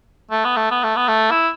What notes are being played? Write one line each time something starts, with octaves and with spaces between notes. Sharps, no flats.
A3
B3
A3
B3
A3
B3
A3
E4